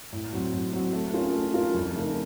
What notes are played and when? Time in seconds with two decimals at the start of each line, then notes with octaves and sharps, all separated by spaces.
0.12 A2
0.32 F#3 C4 F#4
0.53 A2
0.73 F#3 C4 F#4
0.93 A3
1.13 C#4 F4 A#4
1.33 A3
1.54 C#4 F4 A#4
1.74 F2
1.95 C#3 A3 D#4 A#4